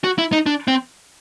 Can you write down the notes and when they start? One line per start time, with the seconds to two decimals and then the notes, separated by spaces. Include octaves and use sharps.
0.04 F#4
0.18 E4
0.32 D#4
0.46 D4
0.68 C4